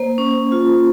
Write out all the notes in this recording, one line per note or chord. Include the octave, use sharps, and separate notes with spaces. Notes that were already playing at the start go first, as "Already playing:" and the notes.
Already playing: A#3 C5
C#4
F4